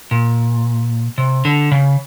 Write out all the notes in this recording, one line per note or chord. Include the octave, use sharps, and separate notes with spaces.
A#2
C3
D3
C#3